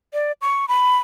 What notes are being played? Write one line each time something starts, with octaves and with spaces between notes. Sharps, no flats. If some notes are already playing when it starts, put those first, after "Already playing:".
D5
C#6
B5